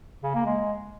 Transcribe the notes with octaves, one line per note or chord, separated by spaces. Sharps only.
C#3
A#3
G#3